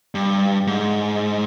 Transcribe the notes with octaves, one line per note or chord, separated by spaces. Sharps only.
G2
G#2